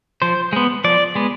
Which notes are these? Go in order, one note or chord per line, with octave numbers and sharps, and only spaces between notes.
F3 C5
G#3 B3
F3 D5
G#3 B3